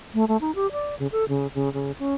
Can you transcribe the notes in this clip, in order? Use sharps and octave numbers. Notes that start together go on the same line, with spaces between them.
A3
A3
D#4
G4
D5
C#3
A4
C#3
C#3
C#3
C#4